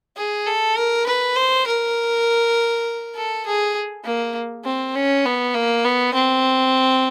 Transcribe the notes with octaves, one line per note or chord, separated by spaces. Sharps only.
G#4
A4
A#4
B4
C5
A#4
A4
G#4
A#3
C4
C#4
B3
A#3
B3
C4